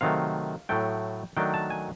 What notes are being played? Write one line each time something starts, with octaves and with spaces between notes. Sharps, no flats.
C3 D#3 F#3 A3 F5
A2 F#3 A3 G5
D#3 F#3 A3 D4 G5
A5
G#5